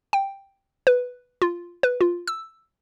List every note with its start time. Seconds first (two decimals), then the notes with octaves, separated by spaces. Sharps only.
0.13 G5
0.87 B4
1.42 F4
1.83 B4
2.01 F4
2.28 E6